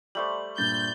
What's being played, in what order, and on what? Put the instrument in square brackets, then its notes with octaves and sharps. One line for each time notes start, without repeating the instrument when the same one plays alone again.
[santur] G3 A3 C5 [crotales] F#7
[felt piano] G2 A#2 [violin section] G6 [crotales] A6